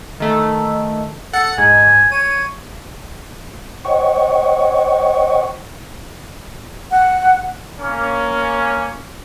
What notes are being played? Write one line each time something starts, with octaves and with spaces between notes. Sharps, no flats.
D#3 A3
A4 F#5 C#7
G#2 G#5
C#5 D#7
C5 C#5 D#5 F#5 G5 C#6
F#5
A#3 C#4